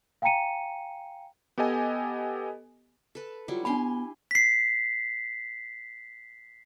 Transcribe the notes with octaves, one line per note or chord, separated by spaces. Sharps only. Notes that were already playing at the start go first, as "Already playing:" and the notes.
F5 G5 G#5 A#5 C#7 D#7
B3 G4 A4 D#5 G#5
A4 B4
F#3 G3 E4 F4
B3 D4 G4 G#5 B5 C6
B6 C7